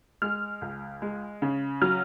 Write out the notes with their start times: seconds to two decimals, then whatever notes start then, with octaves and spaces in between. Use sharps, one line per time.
0.22 G#3 F6
0.61 C#2
1.02 G#3
1.42 C#3
1.81 F#3 F6